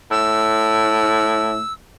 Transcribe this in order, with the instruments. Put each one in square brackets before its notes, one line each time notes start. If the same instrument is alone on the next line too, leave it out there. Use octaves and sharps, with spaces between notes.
[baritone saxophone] A2 [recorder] E6